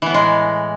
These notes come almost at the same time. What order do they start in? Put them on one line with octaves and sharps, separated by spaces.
E3 B3 A2 G#3